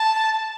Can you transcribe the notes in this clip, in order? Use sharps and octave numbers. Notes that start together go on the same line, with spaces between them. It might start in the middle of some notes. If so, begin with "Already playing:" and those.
Already playing: A5